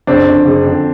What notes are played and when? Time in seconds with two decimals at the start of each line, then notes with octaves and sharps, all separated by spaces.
0.07 F#1 C4 D4
0.26 F2 D3
0.45 F#1
0.64 F2 D3